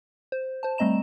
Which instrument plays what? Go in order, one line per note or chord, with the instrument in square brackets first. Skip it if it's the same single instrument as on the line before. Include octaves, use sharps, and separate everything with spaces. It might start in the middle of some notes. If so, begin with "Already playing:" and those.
[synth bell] C5
C5 A5
G3 A3 C4 D#5 A#5 E7